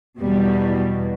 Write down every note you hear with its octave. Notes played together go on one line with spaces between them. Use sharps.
E2 B2 G3